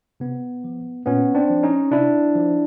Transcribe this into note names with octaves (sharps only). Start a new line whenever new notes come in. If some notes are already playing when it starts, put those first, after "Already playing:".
C3 B3
F3
A#2 B3 C#4
C4 D4
F3
C#4 D#4
C3 D4 E4
F3